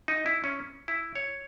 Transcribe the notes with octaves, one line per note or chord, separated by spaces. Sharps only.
D#4
E4
C#4
E4
C#5